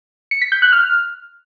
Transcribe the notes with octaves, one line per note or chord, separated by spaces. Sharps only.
C#7
B6
G6
F#6
F6